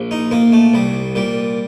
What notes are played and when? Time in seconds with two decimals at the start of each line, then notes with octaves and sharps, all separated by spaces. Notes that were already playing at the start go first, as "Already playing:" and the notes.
Already playing: A#1
0.11 D#4
0.31 A#2 A#3
0.52 A3
0.74 C2 G3
1.15 A#2 G3